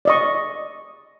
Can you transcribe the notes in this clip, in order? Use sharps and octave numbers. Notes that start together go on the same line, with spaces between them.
D5 D#5 C#6